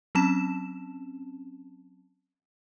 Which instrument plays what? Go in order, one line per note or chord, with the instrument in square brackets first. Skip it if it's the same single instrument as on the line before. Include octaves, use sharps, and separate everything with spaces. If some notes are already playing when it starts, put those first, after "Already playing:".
[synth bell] F#3 C4 C#4 A5 E7